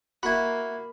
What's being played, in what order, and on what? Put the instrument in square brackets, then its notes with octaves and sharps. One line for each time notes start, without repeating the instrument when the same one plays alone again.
[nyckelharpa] A#3 [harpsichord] E4 F#4 [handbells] B5